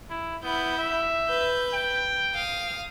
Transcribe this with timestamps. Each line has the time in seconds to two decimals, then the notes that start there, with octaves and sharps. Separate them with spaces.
0.10 E4
0.43 B3 E4 G6
0.79 E5
1.28 B4 G6
1.74 G5
2.34 F5 D#6